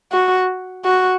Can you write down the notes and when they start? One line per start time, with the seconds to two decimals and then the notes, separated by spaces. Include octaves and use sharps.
0.12 F#4
0.85 F#4